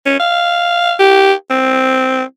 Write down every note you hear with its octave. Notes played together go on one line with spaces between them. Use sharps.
C#4
F5
G4
C4